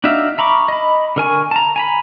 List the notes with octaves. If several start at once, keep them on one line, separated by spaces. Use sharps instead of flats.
D4 D#4 F#4 E5 F5
E5 A#5 B5 C#6 D6
D#5 B5
D3 A#4 G#5 C#6
A5 A#5
G#5 A#5 B5